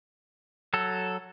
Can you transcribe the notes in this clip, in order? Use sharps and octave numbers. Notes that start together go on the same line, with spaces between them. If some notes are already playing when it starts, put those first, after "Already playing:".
F#3 A4